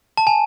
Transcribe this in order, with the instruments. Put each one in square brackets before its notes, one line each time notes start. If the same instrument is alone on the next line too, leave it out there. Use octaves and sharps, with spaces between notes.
[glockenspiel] A5
G#5